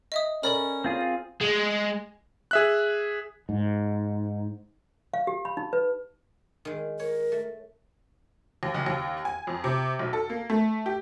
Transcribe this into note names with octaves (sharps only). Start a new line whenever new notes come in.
D#5 E5 D#6
C#4 A4 A#4 D5 B5
C4 F4 G#4
G#3
G#4 E5 F#6
G#2
F5
G4
B5
D#4
B4
D#3 G#3
A#4 C#5
A3
D#2
F#1
D#2
G#5
F2
C3
B1
A4
A#3
A3
G4